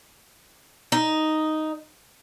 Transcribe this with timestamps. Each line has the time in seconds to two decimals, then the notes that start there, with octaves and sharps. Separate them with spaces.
0.92 D#4